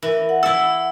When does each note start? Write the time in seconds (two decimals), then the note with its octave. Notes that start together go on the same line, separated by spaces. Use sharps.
0.03 E3 A#4
0.29 F#5
0.43 E4 A4 E6